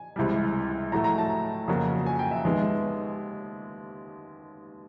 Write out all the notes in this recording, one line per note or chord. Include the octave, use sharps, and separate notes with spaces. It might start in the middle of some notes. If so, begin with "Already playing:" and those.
Already playing: G#5
C#2 C3 E3 G3
A2 F#3 A3 A#5
A#5
A5
F2 C#3 F#3 A#3
G#5
G5
E5
D#2 D#3 G#3 B3